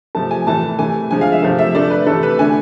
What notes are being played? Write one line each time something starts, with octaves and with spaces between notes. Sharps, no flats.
C3 F3 A3 A5
G#5
A2 E3 A3 A5
C3 E3 A3 G#5
D3 F3 G#3 G#5
F5
E5
C3 F3 A3 F5
E5
D3 A3 D5
B4
C3 E3 A3 A4
B4
D3 A3 G#5